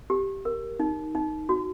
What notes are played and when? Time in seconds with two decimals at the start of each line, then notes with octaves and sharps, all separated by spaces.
0.10 G4
0.45 A#4
0.80 D#4
1.15 D#4
1.49 F#4